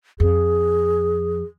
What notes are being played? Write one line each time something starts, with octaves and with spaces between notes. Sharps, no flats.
F2 G#4